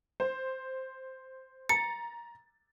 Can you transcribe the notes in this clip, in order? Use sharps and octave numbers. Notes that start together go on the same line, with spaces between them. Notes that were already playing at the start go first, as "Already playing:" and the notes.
C5
A#5 A6 C#7